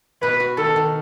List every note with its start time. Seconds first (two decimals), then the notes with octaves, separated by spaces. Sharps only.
0.22 B2 B4
0.40 F#4
0.57 D#3 A4
0.76 D#3